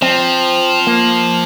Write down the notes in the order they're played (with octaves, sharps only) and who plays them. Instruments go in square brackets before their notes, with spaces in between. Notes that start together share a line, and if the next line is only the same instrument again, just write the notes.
[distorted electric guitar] F3 [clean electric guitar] C4
[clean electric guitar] A#3